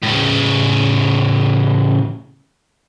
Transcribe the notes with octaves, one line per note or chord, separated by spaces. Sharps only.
A2 C#3